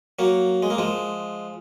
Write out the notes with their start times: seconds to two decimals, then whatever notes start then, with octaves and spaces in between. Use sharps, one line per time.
0.19 F#3 A#3
0.63 G#3
0.70 A#3
0.78 F3 G#3